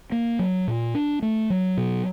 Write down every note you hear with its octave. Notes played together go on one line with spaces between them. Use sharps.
A#3
F#3
A#2
D4
A3
F#3
B2